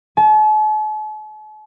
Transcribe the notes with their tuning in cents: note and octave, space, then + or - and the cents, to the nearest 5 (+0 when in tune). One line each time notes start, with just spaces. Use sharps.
A5 -45